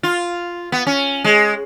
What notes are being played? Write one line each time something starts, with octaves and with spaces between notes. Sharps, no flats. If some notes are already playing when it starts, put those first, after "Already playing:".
F4
B3
C#4
G#3